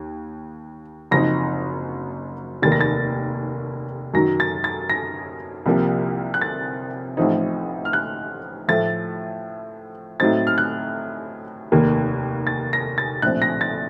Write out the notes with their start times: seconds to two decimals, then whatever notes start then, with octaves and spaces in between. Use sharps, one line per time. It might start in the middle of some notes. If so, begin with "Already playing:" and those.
Already playing: D#2
1.11 F#1 F#2 F3 C4 D#4 A#6
2.62 F1 D#2 D#3 A#3 A6
2.72 A#6
2.81 A6
4.14 F#2 D#3 F#3 A#6
4.40 A6
4.64 A6
4.90 A#6
5.66 C2 C3 F3 A#3
6.34 F#6
6.41 A6
7.17 A1 A2 F3 C4 D#4
7.85 F6
7.93 F#6
8.68 A2 F3 A3 A6
10.20 A2 F#3 C4 D#4 A6
10.47 F6
10.58 F#6
11.72 F1 D#2 D#3 A#3
12.47 A6
12.73 A#6
12.98 A6
13.22 A#1 A2 F3 C4 F#6
13.42 A#6
13.61 A6